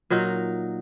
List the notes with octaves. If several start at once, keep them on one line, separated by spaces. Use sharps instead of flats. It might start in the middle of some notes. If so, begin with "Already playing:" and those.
A#2 F#3 D#4